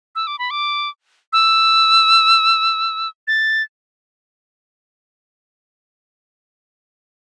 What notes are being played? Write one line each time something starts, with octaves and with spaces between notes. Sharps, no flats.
E6
D6
B5
D6
E6
A6